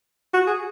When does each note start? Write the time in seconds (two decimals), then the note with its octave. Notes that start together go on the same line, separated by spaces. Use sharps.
0.34 F#4
0.47 G#4